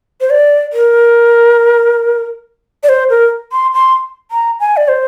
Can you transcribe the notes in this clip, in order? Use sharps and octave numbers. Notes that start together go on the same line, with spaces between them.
C5
D5
A#4
D5
C5
A#4
C6
C6
A#5
G#5
D5
C5